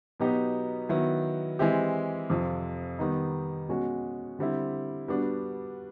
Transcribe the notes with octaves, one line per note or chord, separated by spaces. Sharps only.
B2 F#3 B3 D#4 G4
D#3 F#3 B3 E4
E3 G#3 C4 E4 G4
F2 C3 F3
D#3 G3 B3 D#4
B2 G#3 C#4 F#4
D3 G3 C4 E4
G3 B3 D4 F#4